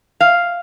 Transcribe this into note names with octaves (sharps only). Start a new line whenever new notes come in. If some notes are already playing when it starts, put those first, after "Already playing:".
F5